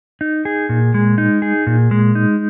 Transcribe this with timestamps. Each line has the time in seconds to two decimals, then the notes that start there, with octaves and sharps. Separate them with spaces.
0.21 D#4
0.45 G#4
0.69 A#2
0.94 G#3
1.18 D#4
1.42 G#4
1.67 A#2
1.91 G#3
2.15 D#4